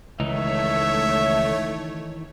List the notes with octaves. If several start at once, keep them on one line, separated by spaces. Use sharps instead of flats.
C#2 D#3 E3 A3 D#4 C#5 E5